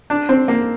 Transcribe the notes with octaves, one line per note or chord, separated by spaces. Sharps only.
D4
C4
A#3